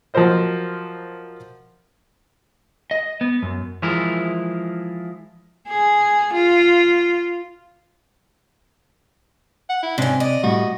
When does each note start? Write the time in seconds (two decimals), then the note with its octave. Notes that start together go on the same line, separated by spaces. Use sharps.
0.14 F3 F#3 A#4 C5 D#5
2.91 D#5
3.21 B3
3.43 F#2
3.82 E3 F3 G#3 E4 A#4
5.69 G#4
6.33 F4
9.69 F#5
9.83 E4
9.98 G#2 C3 C#4 D4
10.20 D5 D#5
10.43 A2 G3 F#4